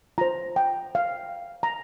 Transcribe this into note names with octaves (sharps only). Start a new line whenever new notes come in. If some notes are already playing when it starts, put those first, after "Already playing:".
F4 C5 A#5
G5
F5
A#5